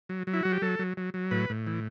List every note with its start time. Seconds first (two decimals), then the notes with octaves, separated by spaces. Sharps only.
0.09 F#3
0.27 F#3
0.33 E4
0.43 F#3 F#4
0.53 G4
0.62 F#3 A4
0.79 F#3
0.97 F#3
1.14 F#3
1.31 A2 B4
1.50 A2
1.67 E3